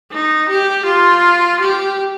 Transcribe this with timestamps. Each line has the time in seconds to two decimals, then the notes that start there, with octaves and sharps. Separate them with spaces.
0.12 D#4
0.49 G4
0.86 F4
1.60 G4